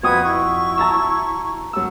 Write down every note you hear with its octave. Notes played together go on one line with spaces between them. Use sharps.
F2 F#4 B4 B5 D#6 G#6
E4 C#6
A5 A#5 E6
F#2 E6